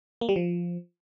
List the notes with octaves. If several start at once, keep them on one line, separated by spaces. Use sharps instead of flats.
A#3
G3
F3